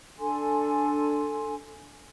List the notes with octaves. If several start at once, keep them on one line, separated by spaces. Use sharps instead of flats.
D4 A4 G#5 C6